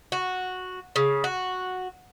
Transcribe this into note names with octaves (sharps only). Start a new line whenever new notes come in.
F#4
C#3
F#4